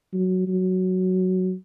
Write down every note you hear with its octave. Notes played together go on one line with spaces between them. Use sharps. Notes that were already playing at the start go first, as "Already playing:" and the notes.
F#3
F#3